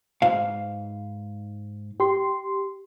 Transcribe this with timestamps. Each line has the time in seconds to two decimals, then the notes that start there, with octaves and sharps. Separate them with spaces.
0.22 G#2 F5
2.00 G4 C6